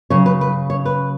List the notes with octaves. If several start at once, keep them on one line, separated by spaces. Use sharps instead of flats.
C#3 F#3 C#5
B4
B4
C#5
B4